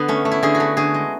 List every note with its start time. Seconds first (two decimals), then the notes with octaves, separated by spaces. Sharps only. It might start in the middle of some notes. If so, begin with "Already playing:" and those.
Already playing: D3 B3
0.08 A3 C#4
0.25 A3
0.31 E4
0.43 D3 G#4
0.55 F#4
0.60 A3
0.77 D3 G#4
0.94 G#3